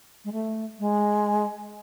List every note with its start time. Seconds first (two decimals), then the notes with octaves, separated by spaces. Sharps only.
0.25 G#3
0.32 A3
0.79 G#3